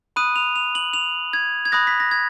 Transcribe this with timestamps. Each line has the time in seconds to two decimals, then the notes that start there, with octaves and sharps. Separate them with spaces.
0.16 B5 D#6 F#6 D#7
0.36 F7
0.56 F7
0.75 F#7
0.93 F7
1.33 G#6
1.65 G#6
1.72 B5 D#6 F#6 A#6
1.87 B6
2.00 A#6
2.11 G#6